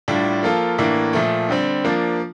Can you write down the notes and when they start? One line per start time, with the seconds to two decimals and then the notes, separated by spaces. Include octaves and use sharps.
0.08 A2 G3 D4 F4
0.43 F3 A#3 F4 A4
0.78 A2 E3 A#3 D4
1.13 A#2 F3 A3
1.49 D3 G3 C4
1.85 F3 A#3 D4